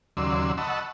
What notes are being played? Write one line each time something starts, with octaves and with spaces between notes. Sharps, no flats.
D#2 C#3 F#3 D5 C6 E6
D#5 F#5 A5 B5 C#6 E6